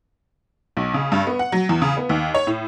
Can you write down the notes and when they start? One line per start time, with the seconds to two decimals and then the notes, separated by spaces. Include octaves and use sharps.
0.77 B1
0.94 C#3
1.12 G2
1.27 B3
1.39 F#5
1.52 F#3
1.69 E2
1.82 C#3
1.97 B3
2.09 D#2
2.34 C#5
2.47 A2